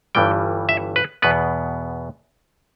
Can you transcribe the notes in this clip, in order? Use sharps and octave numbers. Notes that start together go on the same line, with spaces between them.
G1 G2 E3 G3 G5
E5
B4
E2 B2 B3 B4